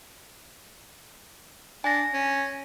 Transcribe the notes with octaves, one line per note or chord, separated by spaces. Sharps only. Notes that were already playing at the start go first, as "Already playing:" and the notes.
D4 G#5 A#6
C#4